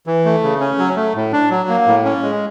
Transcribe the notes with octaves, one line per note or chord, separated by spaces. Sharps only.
E3
A3
C#3
C#4
F#3
A3
A2
D4
F#3
A#3
A2
C#4
G#3